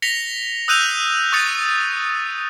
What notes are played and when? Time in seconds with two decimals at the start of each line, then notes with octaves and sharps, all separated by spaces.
0.02 A#6 B6 C#7 F7 G7
0.68 D#6 E6 F#6 G6 D#7 F7
1.32 C#6 D#6 A6 C#7